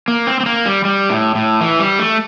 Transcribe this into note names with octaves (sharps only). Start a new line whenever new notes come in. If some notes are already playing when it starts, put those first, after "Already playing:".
A#3
C4
C4
A#3
G3
G3
A2
A2
E3
G3
A3